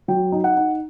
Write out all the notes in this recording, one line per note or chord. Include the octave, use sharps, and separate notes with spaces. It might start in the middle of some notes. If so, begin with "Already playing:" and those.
F#3 G5
D#4
F#5
D#4